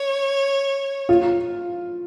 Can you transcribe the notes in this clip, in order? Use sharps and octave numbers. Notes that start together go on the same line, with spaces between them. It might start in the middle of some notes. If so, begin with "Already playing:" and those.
Already playing: C#5
F4